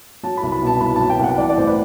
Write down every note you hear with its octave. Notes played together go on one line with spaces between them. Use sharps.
F#3 A5
B5
C2
B5
B2 A5
C2 B5
F#3 A5
G5
C2 F#5
E3 D5
D5
A1 C5
B4